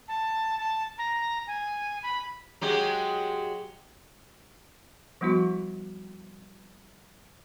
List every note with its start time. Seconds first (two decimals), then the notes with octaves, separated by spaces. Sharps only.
0.08 A5
0.59 A5
0.98 A#5
1.47 G#5
2.03 B5
2.61 F#3 G#3 G4
5.21 F3 G3 B3 E4 F#4